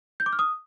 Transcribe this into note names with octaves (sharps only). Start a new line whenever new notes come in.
G6
D6
F6
D#6